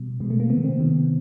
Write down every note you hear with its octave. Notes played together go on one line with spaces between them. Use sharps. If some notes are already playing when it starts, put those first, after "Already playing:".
Already playing: B2 G3
B2 G#3
A3
A#3
C3 D#3 B3
C4
C3 D#3